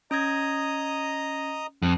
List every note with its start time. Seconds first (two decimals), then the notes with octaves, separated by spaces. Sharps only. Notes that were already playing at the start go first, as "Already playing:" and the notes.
0.11 C#4 D#5 A#5 D#6 G#6
1.82 F2